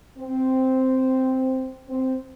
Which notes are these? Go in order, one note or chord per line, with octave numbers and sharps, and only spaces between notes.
C4
C4